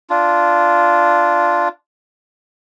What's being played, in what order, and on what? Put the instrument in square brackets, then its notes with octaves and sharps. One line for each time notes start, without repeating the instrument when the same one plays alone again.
[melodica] D4 F4